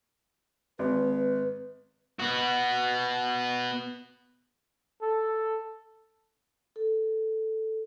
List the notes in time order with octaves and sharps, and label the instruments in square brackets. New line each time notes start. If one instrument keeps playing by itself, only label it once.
[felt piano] G#1 [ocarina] B4
[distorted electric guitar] B3 F#4
[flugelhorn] A4
[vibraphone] A4